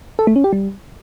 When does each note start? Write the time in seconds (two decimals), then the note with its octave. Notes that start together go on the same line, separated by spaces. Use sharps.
0.19 A4
0.27 A3
0.36 C#4
0.44 G4
0.53 G3